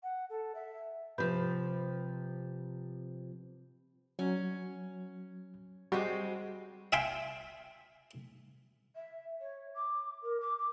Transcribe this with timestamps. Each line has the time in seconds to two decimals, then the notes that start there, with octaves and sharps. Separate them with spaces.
0.03 F#5
0.30 A4
0.55 E5
1.18 C3 F3 B4 B5 G6
4.19 F#3 C#4
5.92 G3 G#3 C4 F#4
6.93 E5 F5 G5 G#5 C6
8.95 E5
9.41 C#5
9.75 D6
10.23 A#4
10.40 D6
10.59 D6